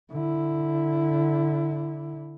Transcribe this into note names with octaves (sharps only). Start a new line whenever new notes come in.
D3 E4